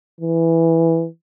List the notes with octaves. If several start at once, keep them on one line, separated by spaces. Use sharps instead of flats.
E3